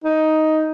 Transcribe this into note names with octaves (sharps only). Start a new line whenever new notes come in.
D#4